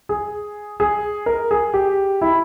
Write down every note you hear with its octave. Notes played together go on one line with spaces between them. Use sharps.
G#4
G#4
A#4
G#4
G4
E4